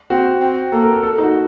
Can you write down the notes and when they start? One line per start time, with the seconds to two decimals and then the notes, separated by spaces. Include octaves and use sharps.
0.10 C4 F#4
0.41 C4
0.72 A#3 A4
0.82 A#4
0.93 A4
1.03 A4
1.18 D#4
1.23 F#4